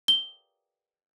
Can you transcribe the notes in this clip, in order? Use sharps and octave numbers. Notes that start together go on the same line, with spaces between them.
G7